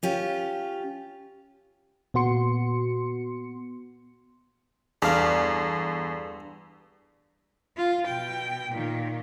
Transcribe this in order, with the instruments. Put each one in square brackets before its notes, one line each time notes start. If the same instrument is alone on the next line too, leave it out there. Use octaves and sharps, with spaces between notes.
[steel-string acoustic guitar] C#4 F4 G4
[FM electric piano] A#2 B3 F#4 C6 C#7
[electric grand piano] E2 [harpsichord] G2 D4 [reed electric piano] G#4 A4 F5
[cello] F4
B2 G5
A#2 D#3